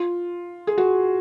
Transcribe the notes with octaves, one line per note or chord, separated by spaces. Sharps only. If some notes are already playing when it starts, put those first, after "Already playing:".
Already playing: F4
G#4
F#4